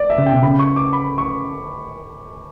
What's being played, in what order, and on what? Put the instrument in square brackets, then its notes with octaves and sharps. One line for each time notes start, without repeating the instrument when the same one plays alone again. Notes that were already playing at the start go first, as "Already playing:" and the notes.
Already playing: [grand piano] D5
E5
[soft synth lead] C#3
[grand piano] G5
[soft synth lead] B2
[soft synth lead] C#3 [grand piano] B5
[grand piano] C#6
D6
B5
C#6